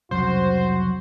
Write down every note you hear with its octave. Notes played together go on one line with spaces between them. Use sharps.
C2 F2 C#3 F#3 F#4 C5